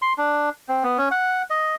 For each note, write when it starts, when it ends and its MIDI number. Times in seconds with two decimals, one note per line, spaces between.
0.02 0.13 84
0.18 0.50 62
0.69 0.84 60
0.84 0.97 59
0.98 1.09 61
1.11 1.43 78
1.50 1.75 75